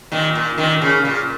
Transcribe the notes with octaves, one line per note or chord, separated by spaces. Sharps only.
A#2 D#3
A#2
A#2 D#3
C#3
A#2